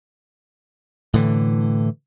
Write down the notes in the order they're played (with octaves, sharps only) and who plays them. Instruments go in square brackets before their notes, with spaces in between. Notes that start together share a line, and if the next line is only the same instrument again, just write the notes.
[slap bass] A2 D3 E3